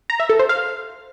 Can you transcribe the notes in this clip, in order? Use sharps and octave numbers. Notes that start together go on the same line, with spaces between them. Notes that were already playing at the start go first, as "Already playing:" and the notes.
A#5
E5
A4
C5
F5